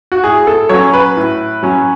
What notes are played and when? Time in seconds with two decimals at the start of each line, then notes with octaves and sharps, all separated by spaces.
0.12 F#4
0.24 A2 G#4
0.47 A4
0.69 F#3 C#4 C#5
0.94 B4
1.17 A2
1.63 F#3 C#4